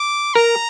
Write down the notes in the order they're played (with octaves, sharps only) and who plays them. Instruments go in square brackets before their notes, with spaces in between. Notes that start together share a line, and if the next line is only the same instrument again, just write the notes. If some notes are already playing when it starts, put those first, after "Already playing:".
Already playing: [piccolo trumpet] D6
[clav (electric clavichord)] A#4 [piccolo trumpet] A#5